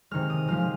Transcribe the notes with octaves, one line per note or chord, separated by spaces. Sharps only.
C3 D#3 G#3 F6
D#6
C3 F3 G#3 F6